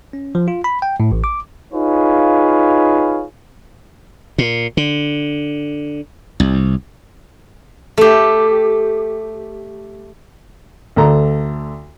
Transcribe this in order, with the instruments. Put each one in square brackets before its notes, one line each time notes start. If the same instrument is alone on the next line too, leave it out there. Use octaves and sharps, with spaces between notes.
[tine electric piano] C#4
F3
F4
B5
G5
A2
A1
D6
[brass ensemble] D#4 F4 G#4 B4 C#5 F5
[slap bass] A#2
D3
C2
[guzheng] A3 G4
[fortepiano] D2 A4 A#5